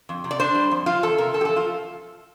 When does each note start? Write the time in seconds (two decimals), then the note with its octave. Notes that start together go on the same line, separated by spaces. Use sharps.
0.09 F2
0.24 C3
0.31 D5
0.40 D4 C5
0.55 G3
0.71 F2
0.86 F3 F4
1.03 E2 A4
1.18 C3 A#4
1.33 E2 A4
1.41 G4
1.45 A4
1.49 F3
1.56 F4